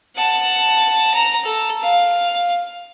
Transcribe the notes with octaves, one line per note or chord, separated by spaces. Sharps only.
F#5 A5
A#5
A4
F5